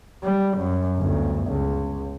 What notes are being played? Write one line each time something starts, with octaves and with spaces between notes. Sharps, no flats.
G3
F#2
G1 D2
C#2